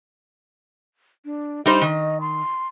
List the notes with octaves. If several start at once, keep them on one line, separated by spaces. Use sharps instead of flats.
D4
G3 D#4 C5 D#5
D#3
C6